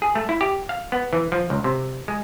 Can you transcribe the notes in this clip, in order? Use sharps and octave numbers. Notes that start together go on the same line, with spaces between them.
G#4
A3
E4
G4
F5
B3
E3
F3
C#2
C3
G#3